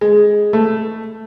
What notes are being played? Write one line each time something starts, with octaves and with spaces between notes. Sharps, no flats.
G#3
A3